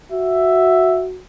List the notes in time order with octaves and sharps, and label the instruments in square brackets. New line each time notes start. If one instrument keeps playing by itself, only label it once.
[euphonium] F#4 [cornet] E5